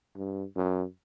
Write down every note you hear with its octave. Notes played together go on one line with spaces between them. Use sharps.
G2
F#2